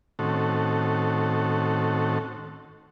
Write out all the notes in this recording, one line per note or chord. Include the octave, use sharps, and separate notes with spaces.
A2 D#3 C4 C#4 F#4 A4